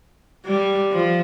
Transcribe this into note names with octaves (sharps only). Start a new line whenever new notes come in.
G3
F3